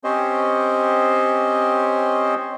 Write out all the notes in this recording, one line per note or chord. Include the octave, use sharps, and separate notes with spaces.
C4 C#4 G4 C5 C#5 D#5